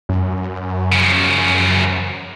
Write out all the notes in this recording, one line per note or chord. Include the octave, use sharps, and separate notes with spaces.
F#2
C#3 F3